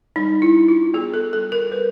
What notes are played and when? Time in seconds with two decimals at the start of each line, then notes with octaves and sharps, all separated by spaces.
0.16 G3 D#4
0.42 E4
0.56 D4
0.68 F4
0.94 B3 G#4
1.14 A4
1.33 G3 A4
1.52 A#4
1.71 G3 B4